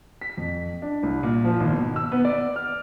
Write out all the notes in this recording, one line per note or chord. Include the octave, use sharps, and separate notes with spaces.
B6
F2
D4
C2
A#2
F3
G#1
B2
E6
B3
D5
F6